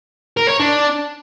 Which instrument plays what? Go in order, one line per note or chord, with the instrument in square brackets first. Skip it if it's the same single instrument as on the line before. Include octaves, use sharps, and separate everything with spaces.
[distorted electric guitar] A#4
C#5
D4